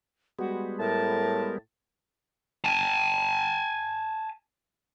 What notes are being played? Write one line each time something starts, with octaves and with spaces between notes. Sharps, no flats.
G3 G#3 B3 F#4
A2 A#4 A5
G#5 A5